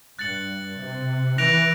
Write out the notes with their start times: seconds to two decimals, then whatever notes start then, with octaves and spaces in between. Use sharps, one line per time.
0.18 G2 F#6 A6 C#7 F#7
0.79 C3
1.38 E3 F#6 A#6 D7 F7